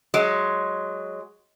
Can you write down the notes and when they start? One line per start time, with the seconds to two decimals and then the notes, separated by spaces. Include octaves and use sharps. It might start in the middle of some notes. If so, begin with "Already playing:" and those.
0.14 F#3 G#3